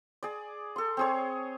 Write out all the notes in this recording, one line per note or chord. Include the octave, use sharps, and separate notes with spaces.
G#4 D5
A4 C6
C4 G#4 C#5